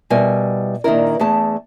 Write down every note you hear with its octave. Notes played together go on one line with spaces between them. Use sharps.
B2 G3 E4 A#4 G#5
A#2 D#3 D4 E4 A#4
E2 A3 G#4 A5